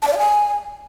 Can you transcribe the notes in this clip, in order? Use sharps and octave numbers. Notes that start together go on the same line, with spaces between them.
A5
D5
F5
G#5